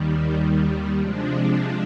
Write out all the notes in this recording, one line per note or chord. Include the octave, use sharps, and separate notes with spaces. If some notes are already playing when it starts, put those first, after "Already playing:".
Already playing: D#2 D#3 G3
C3 F3 G#3 D4